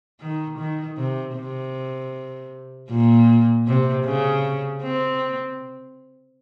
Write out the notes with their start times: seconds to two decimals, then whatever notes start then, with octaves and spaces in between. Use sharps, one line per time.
0.20 D#3
0.58 D#3
0.97 C3
1.36 C3
2.90 A#2
3.67 C3
4.05 C#3
4.82 C4